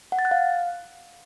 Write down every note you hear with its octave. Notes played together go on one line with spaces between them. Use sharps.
F#5
A6
F#6
F5